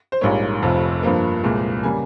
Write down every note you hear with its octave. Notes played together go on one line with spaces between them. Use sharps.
C5
A#1 G#2 G3 A#3 C#5
F1 F2 C3
G2 F3 A#3
C2 A#2 G#3
C#3 G3 A#3 G#5